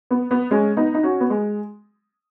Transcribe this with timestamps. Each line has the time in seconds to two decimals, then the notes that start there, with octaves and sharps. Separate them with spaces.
0.11 B3
0.31 B3
0.51 G#3 C#4
0.77 B3 D#4
0.94 D#4
1.03 C#4 F#4
1.20 B3
1.30 G#3